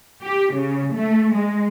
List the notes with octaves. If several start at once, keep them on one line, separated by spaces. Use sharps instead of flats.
G4
C#3
A3
G#3